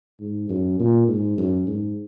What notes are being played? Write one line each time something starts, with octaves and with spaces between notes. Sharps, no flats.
G#2
F#2
A#2
G#2
F#2
G#2